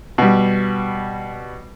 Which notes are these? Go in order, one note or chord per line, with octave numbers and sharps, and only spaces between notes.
B2 G3